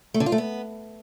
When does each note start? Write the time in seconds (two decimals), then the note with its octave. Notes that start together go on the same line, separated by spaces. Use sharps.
0.14 A3
0.20 D3
0.26 F4
0.32 A3
0.38 B3